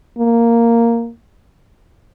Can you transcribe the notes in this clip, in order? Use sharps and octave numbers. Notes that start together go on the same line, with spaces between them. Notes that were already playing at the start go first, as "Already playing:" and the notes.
A#3